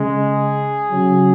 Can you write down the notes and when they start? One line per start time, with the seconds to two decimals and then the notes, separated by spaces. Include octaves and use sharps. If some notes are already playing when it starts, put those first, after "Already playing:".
Already playing: C#3 G#3
0.19 G#4
0.92 C#3 F#3